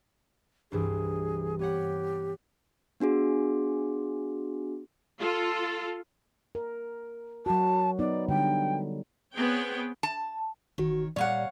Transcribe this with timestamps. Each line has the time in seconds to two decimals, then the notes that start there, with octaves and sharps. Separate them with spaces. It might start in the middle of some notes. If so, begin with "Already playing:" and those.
0.72 C2 G2 E3 G#4
1.59 B3 G4 C#5 F#5
3.00 B3 D4 F#4 G#4
5.18 F4 A4
6.55 A#4
7.46 F#3 F#4 A5
7.99 B3 D#4 D5
8.29 D3 G3 G5
9.33 B3 C4 G#4 C#5 G5
10.03 A5
10.78 G1 D#3 F#4 C#5
11.16 A#2 G3 C#5 D5 F5 F#5